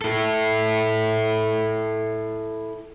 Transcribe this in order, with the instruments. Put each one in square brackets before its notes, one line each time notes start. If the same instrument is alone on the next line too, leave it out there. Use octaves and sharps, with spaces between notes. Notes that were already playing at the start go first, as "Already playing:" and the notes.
[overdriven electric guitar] E4 A4